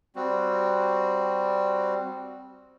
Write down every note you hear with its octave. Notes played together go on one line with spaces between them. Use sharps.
G3 C4 F#4